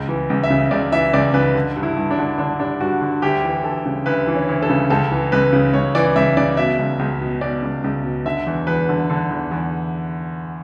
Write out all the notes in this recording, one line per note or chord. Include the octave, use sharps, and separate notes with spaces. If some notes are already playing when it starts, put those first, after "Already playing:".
Already playing: C#2
E3
C#2
E5
C#3
C#2 D5
E3 E5
C#2 D5
C#3 B4
D3
G2
E4
G2
D4
D3
D3 D4
G2 D4
G2 F#4
D3
D2 G4
E3
D2 A4
C#3
D2 B4
E3
C#4
D2
A4
C#3
C#2 A4
E3
C#2 B4
C#3
C#2 C#5
E3 D5
C#2 E5
C#3 D5
B2 E5
C#2
C#2
B2
B2 D5
C#2
C#2
B2
D3 E5
E2
E2 B4
D3
D3
E2
E2